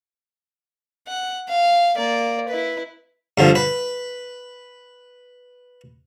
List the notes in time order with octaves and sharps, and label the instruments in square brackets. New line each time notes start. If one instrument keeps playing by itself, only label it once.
[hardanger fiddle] F#5
F5
A#3 D5
E4 B4
[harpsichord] G2 D3 F3
B4